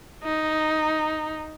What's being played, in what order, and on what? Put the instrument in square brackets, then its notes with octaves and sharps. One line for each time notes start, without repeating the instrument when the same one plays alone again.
[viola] D#4